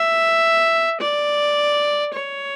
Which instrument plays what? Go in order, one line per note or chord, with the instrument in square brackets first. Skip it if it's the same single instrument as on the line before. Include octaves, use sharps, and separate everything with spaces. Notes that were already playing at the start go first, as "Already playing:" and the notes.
Already playing: [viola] E5
D5
C#5